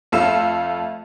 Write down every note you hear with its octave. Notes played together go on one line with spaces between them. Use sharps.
F2 A3 F5 E6 E7